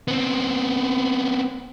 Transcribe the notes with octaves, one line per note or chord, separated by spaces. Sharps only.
B3 C4